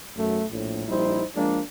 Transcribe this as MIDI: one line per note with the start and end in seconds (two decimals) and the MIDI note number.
0.16 0.45 35
0.16 0.45 42
0.16 0.45 54
0.16 0.45 57
0.51 0.88 34
0.51 0.88 45
0.88 1.25 34
0.88 1.25 55
0.88 1.25 63
0.88 1.25 64
0.88 1.25 72
1.36 1.61 53
1.36 1.61 56
1.36 1.61 58
1.36 1.61 62